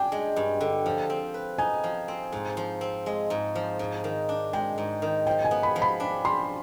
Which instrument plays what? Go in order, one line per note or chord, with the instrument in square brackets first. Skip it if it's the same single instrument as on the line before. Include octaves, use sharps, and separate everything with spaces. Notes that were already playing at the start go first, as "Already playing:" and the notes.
Already playing: [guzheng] D4 [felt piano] G5 G#5
[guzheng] G#3
G2
D3
F3
C4
B4
[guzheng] D#4 [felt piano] G#5
[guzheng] F3
C4
G#2
F3
C4
G#3
G#2
F3
G#2
D#3
D4
[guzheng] G#3 [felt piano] G5
[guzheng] G#2
D#3
[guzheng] F3 [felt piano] G5
[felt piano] G#5
[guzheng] B3
[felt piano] B5
[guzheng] F3
[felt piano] B5
[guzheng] D4
[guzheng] F3 [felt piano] C6